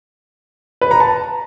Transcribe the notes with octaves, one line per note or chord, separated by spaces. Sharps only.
B4
A#5
A5